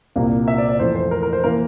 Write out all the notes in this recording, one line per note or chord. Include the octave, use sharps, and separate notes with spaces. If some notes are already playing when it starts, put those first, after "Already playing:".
C2 A#2 G3 A#3
E5
D5
D5
F2 E3 A3 C5
C5
A#4
A#4
C5
E3 A#3 A#4